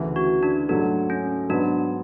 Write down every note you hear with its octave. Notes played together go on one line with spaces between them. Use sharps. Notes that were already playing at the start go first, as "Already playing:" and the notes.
Already playing: D2 C#3 E3
F#4
D4
G#2 F#3 A3 D4
C#4
G#2 F#3 B3 D4